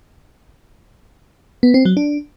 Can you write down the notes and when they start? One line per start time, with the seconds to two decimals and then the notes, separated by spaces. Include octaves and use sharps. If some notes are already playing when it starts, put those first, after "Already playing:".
1.63 B3
1.74 C4
1.85 F#3
1.97 D4